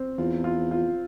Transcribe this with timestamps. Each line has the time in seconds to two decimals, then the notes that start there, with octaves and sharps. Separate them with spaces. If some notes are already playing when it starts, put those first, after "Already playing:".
Already playing: C4
0.18 E2 F4
0.44 F4
0.71 F4